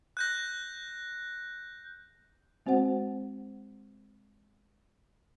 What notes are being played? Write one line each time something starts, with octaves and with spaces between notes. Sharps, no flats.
F#6 G6 A#6
G#3 C4 F#4 C5 F#5